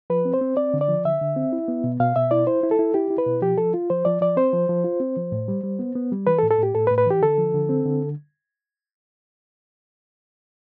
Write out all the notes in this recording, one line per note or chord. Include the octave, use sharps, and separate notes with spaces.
F3 B4
C4
C5
C4
C4 D5
D3
D5
F3
D3 E5
D3
C4
E4
B3
B2
B2 F5
B2 E5
E4 D5
E4 C5
E4
A4
E4
E4 G4
E4
B4
B2
F3 G4
F3 A4
F4
F3 C5
F3 D5
F3 D5
C4 C5
F3
F3
F4
C4
F3
A2
G3
G3
B3
B3
G3
E3 B4
A4
A2
A4
A2 G4
A2 A4
B4
A2
B4
E3 G4
D3 A4
F3
D3
C4
D3